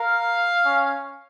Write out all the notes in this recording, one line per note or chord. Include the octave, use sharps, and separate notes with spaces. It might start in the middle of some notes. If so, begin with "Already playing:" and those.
Already playing: A#4 F5
C#4